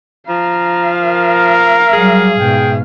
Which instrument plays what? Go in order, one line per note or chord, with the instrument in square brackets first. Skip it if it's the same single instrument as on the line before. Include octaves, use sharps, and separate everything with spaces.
[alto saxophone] F3 [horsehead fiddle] F5 [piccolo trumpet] A#5
[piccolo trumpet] A#4
[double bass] F#3 G3 [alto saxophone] G#4
[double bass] G#2 B2 [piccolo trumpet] G5